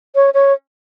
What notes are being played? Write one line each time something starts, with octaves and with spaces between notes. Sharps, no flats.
C#5
C#5